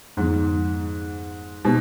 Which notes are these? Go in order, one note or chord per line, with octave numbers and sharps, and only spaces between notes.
F2 G#2 D3 F3 B3 D#4
B2 G#3 B3 D#4 G4 C5